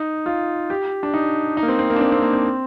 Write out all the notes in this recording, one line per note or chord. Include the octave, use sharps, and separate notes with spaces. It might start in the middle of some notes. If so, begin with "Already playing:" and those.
Already playing: D#4
F4
G4
D4
D#4
D#4
A#3
C4
C4
A#3
D4
C4
C4
A#3
C4